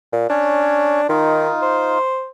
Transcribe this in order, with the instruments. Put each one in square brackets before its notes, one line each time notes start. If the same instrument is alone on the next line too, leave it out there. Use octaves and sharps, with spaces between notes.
[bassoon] A#2
[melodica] C#4 C#5 [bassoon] D4
[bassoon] D#3 [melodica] D#4 F4
[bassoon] C5